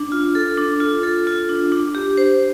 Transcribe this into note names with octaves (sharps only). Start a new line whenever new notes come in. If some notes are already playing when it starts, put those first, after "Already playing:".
Already playing: D4
F4
A4
D4
F4
A4
F4
D4
D4
G4
C5